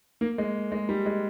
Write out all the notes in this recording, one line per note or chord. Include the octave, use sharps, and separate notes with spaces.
A#3
G#3
G#3
G3
G#3